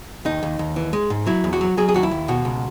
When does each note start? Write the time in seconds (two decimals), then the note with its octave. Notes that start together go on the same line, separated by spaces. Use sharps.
0.25 D#2 D#4
0.43 D#2
0.59 D#2
0.76 E3
0.93 G#3
1.10 G#2
1.27 F#3 E4
1.44 E2
1.53 F#4
1.61 F#3
1.77 F#3 G#4
1.89 G#4
1.94 D#2 F#4
2.03 E4
2.11 D#2
2.28 B2 F#4
2.45 C#2